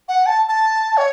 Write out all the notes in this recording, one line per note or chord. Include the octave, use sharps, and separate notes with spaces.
F#5
A5
A5
C#5